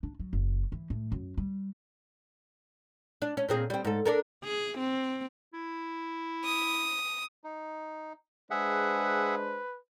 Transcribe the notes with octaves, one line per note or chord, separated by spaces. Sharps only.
D4
F#3
F#1
E3
A2
F#2
G3
D4
C#4
A#2 C4 G#4
G3 C4
G#2 A4
D4 A4 A#4
G#4
C4
E4
D#6
D#4
G#3 D4 G#4 B4 C5 E5 F#5